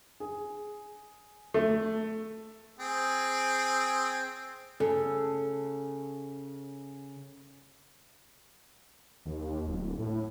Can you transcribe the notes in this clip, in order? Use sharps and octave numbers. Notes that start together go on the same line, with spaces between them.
G#4
A3
C4 G#4
C#3 A4
D#2
D1
A2